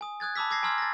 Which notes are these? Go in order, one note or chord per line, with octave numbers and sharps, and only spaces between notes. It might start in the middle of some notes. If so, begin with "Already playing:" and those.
G#5 D#6
D#6 F#6 G#6 A6
A5 B5 D6 E6 B6
D6 E6 G#6 A#6 C7
G#5 A#5 C6 E6 F6 G#6
A6 A#6